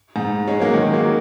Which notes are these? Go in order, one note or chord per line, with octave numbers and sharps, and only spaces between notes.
G#2
G#3 C#4
F#3 A#3
D#3 G#3
F#3 A#3